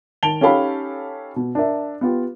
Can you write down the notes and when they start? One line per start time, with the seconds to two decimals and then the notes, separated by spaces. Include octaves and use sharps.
0.23 D#3 A5 D7 F7 G7
0.41 C#4 D#4 G4 A4 F5 B5
1.36 B2
1.55 D4 A#4 E5
2.01 B3 F4 G4